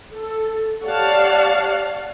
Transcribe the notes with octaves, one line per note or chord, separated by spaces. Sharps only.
A4
G4 C#5 D5 F5 F#5 A5